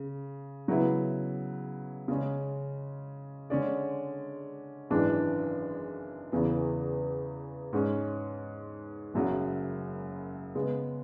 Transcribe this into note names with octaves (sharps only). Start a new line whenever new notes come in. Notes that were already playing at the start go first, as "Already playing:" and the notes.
Already playing: C#3
C#3 F#3 B3 E4
C#3 G#3 C#4
D3 G#3 C#4 G#4 D5
G#1 F#2 E3 G#3 D4
E2 C#3 E3 B3
G#2 G#3 C#4
F#1 F#2 C#3 F#3
C#3 G#3 B3